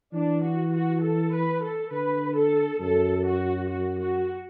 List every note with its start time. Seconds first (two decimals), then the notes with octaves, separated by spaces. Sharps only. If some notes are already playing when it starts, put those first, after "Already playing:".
0.13 E3 D4
0.43 F#4
0.72 F#4
1.02 A4
1.32 B4
1.62 A4
1.91 D3 B4
2.36 A4
2.81 F#2 A4
3.26 F#4
3.70 F#4
4.00 F#4